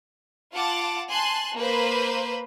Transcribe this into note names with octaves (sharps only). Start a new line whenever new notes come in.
F4 F#5 A5 D6
G#5 A5 C6 F#6
A#3 B4 C5